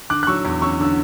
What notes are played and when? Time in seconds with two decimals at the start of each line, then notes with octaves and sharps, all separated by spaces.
0.10 D3 D6 F#6
0.23 F#6
0.27 F#3 C#6 E6
0.45 E2
0.62 C#4 C#6 E6
0.80 D3 E6